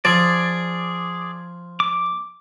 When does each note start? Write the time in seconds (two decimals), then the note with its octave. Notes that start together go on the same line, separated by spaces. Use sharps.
0.05 F3 G#4 D5
1.80 D6